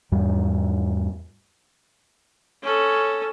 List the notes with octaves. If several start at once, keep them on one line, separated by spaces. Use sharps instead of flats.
E2 G#2 G3
C#4 A4